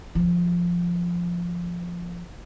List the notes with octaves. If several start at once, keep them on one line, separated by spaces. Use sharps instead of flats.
D3 F3